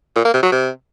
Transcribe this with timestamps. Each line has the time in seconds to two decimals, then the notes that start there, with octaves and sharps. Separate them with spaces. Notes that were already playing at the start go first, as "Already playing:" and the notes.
0.16 A#2
0.25 A#3
0.34 C3
0.43 F#3
0.52 C3